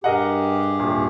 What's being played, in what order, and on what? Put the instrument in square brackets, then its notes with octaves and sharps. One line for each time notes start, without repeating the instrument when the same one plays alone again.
[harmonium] G2 G4 G#4 [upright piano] A#4 D#5 F#5
[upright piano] D#1 D#2